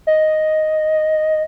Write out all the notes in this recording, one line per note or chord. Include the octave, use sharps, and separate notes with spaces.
D#5